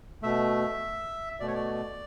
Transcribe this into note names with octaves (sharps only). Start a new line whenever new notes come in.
B2 A3 E5
B2 A3 D5
C#5
D5